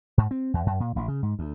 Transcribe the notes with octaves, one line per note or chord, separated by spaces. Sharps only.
G#2
C4
E2
F#2
A#2
A1
C#3
G#2
D2